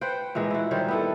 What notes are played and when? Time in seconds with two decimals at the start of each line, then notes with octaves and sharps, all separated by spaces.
0.01 B4 C5 F#5 G5
0.35 A#2 E3 G#3
0.51 E4 F#4
0.71 D#3 G3 C5 C#5
0.88 B3 E4 A4